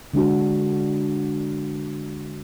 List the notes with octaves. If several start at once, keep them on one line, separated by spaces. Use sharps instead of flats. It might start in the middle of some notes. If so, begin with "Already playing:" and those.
D3 G#3 D4 F#4